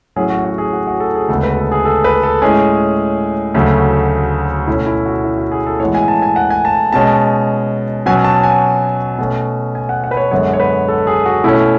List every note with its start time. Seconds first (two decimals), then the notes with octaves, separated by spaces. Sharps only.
0.16 A2 F#3 C#4 G#4
0.30 F#4
0.45 F#4
0.58 G#4
0.73 F#4
0.87 F#4
1.00 A4
1.15 G#4
1.28 D2 C#3 G#3 B3 A4
1.43 B4
1.57 A4
1.72 G#4
1.85 A4
2.04 B4
2.23 A4
2.42 A2 G#3 C#4 G#4
3.54 D2 C#3 F#3 A3
4.67 B2 A3 C#4 E4
4.86 E4
5.06 F#4
5.23 E4
5.38 F#4
5.52 G#4
5.66 A4
5.80 A2 E3 G#3 B3 C#5
5.95 G#5
6.08 A5
6.22 G#5
6.36 F#5
6.50 G#5
6.65 A5
6.92 B2 G#3 C#4 A5
8.06 B2 F#3 C#4 G#5
8.24 A5
8.43 G#5
9.18 B2 A3 C#4
9.75 G#5
9.89 F#5
10.04 F#5
10.11 B4
10.17 C#5
10.31 F#2 D3 G#3 B3 C#5
10.53 C#5
10.60 B4
10.88 A4
11.07 G#4
11.26 F#4
11.44 B2 A3 C#4 E4